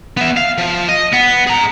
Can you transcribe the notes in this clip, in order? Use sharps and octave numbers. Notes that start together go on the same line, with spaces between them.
B3 E5
F5
F3
D#5
B3
G#4 A#5